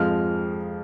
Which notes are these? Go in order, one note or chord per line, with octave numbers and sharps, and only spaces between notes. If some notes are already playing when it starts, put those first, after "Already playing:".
Already playing: F2 F3 G#3 F6